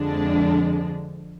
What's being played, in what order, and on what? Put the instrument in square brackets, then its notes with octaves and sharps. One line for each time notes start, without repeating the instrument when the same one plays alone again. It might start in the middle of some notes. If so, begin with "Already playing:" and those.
Already playing: [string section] F2 D3 G#3 D4